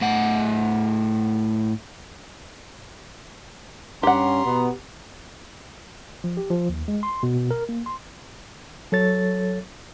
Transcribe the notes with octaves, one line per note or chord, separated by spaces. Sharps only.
A2 F#5
G2 C#4 G4 F#5 A#5 C6
B2 B3
F3
G4
F3
D#2
G#3
C6
B2
A#4
A#3
C6
F#3 A4 C#5 A6